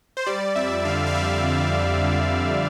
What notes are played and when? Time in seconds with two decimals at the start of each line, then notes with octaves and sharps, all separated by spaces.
0.17 C5
0.26 G3 D5
0.55 F2 E5
0.85 D3 F5
1.06 F5
1.14 G3 E5
1.44 F2
1.73 F2
2.02 D3
2.31 F2